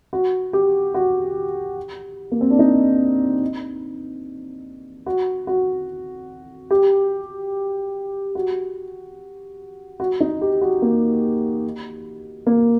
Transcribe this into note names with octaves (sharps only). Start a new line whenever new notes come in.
F#4
G4
F#4
A#3
C4
D4
D#4
F#4
F#4
G4
F#4
F#4
D#4
G4
F#4
A#3
A#3